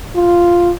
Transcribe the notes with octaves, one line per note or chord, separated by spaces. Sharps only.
F4